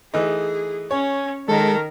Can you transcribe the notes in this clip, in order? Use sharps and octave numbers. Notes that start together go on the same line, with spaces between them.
E3 A3 D#4 G#4
C#4 C#5 G#5
D#3 G#3 A4 A#4